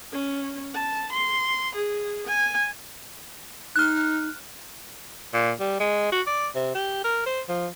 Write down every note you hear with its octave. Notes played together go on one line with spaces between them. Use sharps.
C#4
A5
C6
G#4
G#5
D#4 F6 F#6
A#2
G3
G#3
F#4
D5
C3
G4
A#4
C5
F3